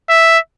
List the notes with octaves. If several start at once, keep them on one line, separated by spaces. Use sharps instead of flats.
E5